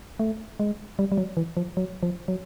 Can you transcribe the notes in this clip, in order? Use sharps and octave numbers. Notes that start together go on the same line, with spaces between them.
A3
G#3
G3
G3
F#3
E3
F3
F#3
F3
F#3